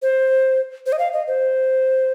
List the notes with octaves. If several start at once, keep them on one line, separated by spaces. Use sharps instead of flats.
C5
C5
D#5
F5
D#5
C5